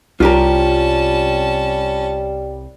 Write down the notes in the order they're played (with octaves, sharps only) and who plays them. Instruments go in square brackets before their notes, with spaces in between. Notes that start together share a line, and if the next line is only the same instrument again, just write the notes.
[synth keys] C2 [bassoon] G3 [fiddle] C#4 A5 [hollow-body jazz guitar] F4 G4 A#4